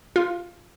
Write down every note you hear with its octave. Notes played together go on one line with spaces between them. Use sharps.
F4